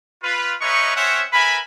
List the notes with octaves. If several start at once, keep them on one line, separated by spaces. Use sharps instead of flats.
F4 B4
G#3 D#4 B4 C#5 E5 C#6
C4 C#4 C5 C#5 E5 F#5
A#4 B4 E5 G#5 B5